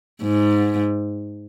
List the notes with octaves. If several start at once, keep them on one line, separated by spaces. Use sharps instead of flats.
G#2